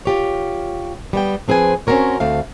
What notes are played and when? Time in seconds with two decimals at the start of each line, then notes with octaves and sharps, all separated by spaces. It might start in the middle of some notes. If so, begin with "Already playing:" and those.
0.05 F4 G4 C#5
1.13 G3 B3 G5
1.48 F3 C4 G#4 B4 G#5
1.87 C4 C#4 F#4 A#4 C#5
2.20 D2 A3 C4 F5